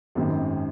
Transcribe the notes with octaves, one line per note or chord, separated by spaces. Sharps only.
G#1 F#2 D#3 G#3 C4